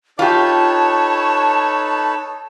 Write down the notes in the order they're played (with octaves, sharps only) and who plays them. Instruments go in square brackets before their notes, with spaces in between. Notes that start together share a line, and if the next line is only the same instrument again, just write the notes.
[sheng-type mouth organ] D#4 A4 B4 [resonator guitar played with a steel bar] F4 G4 [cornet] C#5 [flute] A5